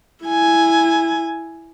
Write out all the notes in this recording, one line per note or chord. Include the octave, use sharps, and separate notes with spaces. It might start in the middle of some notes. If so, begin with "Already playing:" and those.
E4 G#5